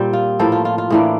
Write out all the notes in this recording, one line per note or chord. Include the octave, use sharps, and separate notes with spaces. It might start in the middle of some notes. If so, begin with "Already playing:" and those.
Already playing: A#2 G3 C4
F4
A2 F3 A#3 A4
F4
F4
F4
A2 E3 A#3 D4